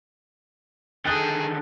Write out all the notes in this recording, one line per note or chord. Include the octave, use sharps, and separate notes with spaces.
D3 D#3 G#4 A4 G5 D#6 F#6 A6